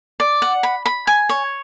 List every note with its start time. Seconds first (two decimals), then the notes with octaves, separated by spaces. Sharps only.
0.20 D5
0.42 F#5
0.63 B5
0.86 B5
1.07 G#5
1.29 C#5